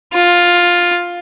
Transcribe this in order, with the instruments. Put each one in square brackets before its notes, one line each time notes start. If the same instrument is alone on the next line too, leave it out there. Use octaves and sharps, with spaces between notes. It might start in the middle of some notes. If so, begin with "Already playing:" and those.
[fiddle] F4